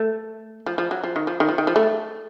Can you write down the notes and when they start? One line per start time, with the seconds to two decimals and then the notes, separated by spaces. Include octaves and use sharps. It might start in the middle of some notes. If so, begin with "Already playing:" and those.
Already playing: A3
0.66 F3
0.78 F3
0.91 F#3
1.04 F3
1.16 D#3
1.27 F3
1.40 D#3
1.49 F3
1.58 D#3
1.67 F3
1.76 A3